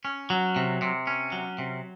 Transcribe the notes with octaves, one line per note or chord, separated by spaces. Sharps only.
C#4
F#3
C3
C3
C#4
F#3
C3